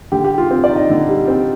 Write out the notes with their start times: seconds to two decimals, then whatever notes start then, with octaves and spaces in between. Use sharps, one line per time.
0.12 D3 G4
0.24 G4
0.31 G3
0.38 F4
0.51 C4
0.64 D5
0.70 D#4
0.76 D#5
0.89 D3
1.09 G3
1.28 C4